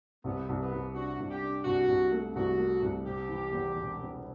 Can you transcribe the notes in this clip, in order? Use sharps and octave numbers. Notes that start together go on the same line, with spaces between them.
C2 B3
C2
B3
C2
D4 F#4
C2
G4
D4
C2 F#4
C2
A3
C2 F#4
A3
C2
C3 G4
E3
E2
E1
C3